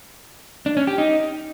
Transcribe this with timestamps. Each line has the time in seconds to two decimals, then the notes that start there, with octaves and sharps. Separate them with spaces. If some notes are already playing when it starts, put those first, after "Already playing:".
0.66 D4
0.77 C#4
0.87 G4
0.98 D#4